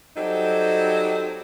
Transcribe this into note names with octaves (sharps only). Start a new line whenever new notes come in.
F#3 G3 C4 D#4 A4